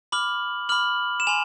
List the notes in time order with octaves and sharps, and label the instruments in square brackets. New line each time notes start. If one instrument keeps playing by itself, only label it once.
[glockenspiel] B5 D6 F6 F#7
B5 D6 F6 F#7
E7
G#5 C6 F7